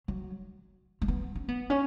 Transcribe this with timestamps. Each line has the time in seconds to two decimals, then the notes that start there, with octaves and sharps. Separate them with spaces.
0.08 F#3
1.02 A3
1.08 B3
1.35 C#4
1.48 B3
1.70 C#4